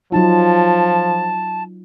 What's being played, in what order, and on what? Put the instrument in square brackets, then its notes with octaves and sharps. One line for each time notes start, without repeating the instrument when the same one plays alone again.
[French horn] F3 [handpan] F#3 D#4 F4 [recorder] A5